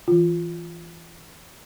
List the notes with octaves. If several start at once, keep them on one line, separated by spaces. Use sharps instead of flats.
E3 F4